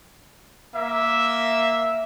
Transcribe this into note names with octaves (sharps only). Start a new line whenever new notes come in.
A#3 E5